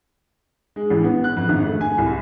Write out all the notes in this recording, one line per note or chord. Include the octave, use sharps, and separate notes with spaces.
G#3
A1
B3
F#6
F2
G#1
A3
G#5
C2